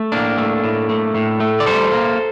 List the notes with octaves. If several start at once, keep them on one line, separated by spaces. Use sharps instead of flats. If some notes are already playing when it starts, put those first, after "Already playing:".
Already playing: A3
A2 A#3 D4
A3
A2
A3
A2
A3
D5
G3 A4 C5
A#3